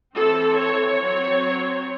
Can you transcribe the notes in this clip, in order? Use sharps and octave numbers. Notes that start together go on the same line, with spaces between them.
E3 C4 A4
C#5
F#3 C4